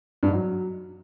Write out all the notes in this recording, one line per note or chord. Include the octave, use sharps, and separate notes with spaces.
G2
G#2
F#3